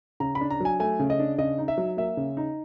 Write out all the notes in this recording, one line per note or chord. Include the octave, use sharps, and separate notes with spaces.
C#3 A#5
B5
D4
A#5
F#3 G#5
A3 G#5
C#3
D#5
D4
C#3 D#5
D#4
E5
F#3
A#3 E5
C#3
D#4